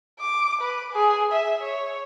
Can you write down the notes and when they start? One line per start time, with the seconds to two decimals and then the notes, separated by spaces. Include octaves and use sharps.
0.20 D6
0.61 B4
0.93 G#4
1.32 E5
1.63 C#5